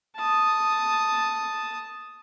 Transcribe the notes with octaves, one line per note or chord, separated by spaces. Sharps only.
A5 D#6